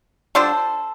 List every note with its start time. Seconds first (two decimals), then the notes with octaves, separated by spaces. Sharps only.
0.35 D3 G3 D4 F4 A4 C5